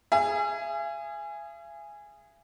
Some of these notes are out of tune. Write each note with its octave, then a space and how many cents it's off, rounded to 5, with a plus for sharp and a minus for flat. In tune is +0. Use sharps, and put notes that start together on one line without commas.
G#4 -5 E5 +45